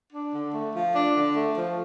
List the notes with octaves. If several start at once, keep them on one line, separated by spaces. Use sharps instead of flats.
D4
D3
A3
F3
D4
D3
A3
F3